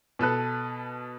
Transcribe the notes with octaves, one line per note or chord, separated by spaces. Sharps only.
B2 A4 B4 F#6